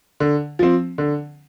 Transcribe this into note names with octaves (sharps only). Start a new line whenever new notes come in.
D3
F3 C4
D3